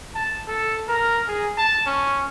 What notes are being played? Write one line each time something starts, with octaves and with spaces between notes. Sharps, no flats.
A5
A4
A#4
G#4
A5
C#4